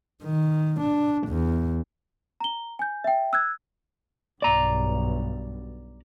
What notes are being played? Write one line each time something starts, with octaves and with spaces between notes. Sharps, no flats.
D#3
D4
E2
A#5 G7
G#5 G6
E5 G5
E6 F#6 G#6
B1 G2 D5 A#5